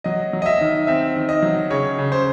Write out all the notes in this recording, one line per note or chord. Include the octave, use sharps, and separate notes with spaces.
F#3 D#5
F#3
D#5
E5
D#3
C4 E5
D#3
D#5
F#3
C#3 C#5
C#3
C5